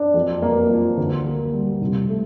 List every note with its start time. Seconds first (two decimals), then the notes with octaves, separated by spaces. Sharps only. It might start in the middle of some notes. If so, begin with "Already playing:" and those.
Already playing: D4
0.14 F2
0.42 A#3
0.70 F3
0.98 D2
1.25 A#3
1.53 G3
1.81 C2
2.09 A3